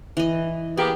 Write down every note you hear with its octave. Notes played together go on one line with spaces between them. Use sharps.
E3 D#5
A#3 B3 G4 G#4